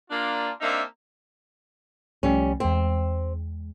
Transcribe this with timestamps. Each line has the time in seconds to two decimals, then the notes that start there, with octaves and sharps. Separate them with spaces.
0.10 A#3 D4 F4
0.61 A#3 C4 D4 D#4 E5
2.23 C2 F3 G3 A3 C#4
2.60 E2 G#3 C4